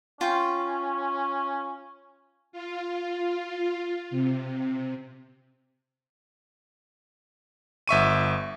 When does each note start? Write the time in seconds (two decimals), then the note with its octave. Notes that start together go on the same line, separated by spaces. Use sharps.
0.21 C#4 F4 G5 C6
2.52 F4
4.11 C3
7.88 G1 E5 C#6 D#7